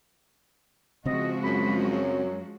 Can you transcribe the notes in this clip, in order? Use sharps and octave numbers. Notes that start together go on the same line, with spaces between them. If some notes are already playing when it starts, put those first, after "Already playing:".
C#3 F3 G#3 C4 F#4 D#5
F#2 B5
F#3